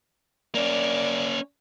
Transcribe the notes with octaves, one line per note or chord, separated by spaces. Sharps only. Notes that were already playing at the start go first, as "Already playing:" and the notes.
A#3 C#4 D5